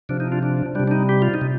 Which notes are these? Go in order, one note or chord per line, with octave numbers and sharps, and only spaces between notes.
C3 F3 D4
D#4
D4 F4
D4
C3 G3 D4
D4
D#4
G4
F4
D#4
C3